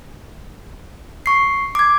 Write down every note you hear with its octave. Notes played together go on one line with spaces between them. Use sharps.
C#6 C7
D6 G#6